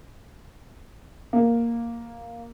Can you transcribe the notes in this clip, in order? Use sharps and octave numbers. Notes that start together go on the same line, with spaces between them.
A#3